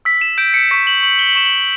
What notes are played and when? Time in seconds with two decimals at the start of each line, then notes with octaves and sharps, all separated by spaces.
0.05 E6 B6
0.21 E7
0.38 G6 D7
0.54 C#7
0.71 C#6 B6
0.87 F#7
1.02 C#6 F#7
1.19 G7
1.29 F#7
1.35 C#6 E7
1.46 F#7